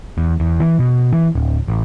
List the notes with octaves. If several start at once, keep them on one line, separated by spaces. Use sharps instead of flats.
E2
E2
E3
B2
E3
D1
A1